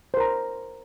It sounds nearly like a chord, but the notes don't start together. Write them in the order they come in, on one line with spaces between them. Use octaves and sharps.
C5 A#4 A#5